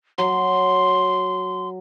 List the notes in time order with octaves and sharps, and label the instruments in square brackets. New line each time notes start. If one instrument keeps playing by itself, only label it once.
[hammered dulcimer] F#3 [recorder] C6